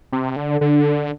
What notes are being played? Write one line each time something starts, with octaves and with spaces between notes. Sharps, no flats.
C3
D3
D3